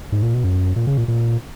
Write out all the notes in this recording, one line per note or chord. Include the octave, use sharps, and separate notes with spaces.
G#2
A#2
B2
F#2
A#2
C#3
A#2
A#2